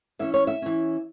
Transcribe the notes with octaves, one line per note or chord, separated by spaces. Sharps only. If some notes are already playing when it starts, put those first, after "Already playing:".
E3 C#4 E5
C#5
E5
E3 C#4